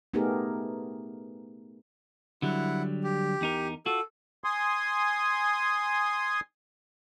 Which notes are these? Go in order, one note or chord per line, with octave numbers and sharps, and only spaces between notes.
A3 B3 D#4 G4 G#4 A#4
D3 F#3 G3 E4 F#5
G4
E2 D#4 A#4
F4 F#4 A4
G#5 C6 D#6